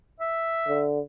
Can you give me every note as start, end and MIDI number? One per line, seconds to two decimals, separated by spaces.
0.20 0.85 76
0.68 1.00 50